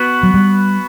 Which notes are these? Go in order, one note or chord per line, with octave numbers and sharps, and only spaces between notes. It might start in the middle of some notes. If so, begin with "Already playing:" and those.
Already playing: B3 F#4 B4
F#3
G3